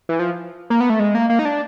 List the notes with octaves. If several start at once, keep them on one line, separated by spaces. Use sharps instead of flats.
E3
F3
A#3
B3
A3
G#3
A#3
A#3
D#4
D4